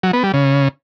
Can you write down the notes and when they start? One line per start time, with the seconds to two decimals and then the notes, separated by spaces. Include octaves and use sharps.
0.03 F#3
0.13 B3
0.24 G3
0.34 C#3